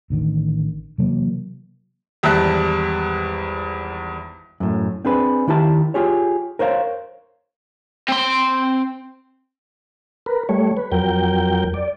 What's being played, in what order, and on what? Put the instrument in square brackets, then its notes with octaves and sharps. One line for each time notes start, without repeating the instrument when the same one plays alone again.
[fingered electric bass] A1 D3 D#3
C3 E3 F#3 A#3
[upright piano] G#1 E2 G3 E5 A5 F#6
[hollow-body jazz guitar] F#2 A2
C4 D4 G#4 B4
D#3 E4 G4 A5
F4 G4 G#4 C#5
A#4 C5 C#5 F5
[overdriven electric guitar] C4 C6
[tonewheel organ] A#4 B4
G3 A3 C#5
B4
F2 F#3 A#4 G5
D5